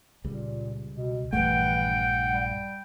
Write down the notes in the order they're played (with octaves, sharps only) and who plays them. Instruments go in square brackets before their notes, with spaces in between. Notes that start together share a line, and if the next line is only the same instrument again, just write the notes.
[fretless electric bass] C#2 G3 [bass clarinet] A#2
[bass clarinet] B2
[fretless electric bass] A#1 G2 A3 [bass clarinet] E3 [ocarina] F#5 [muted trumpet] G5
[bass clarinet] G3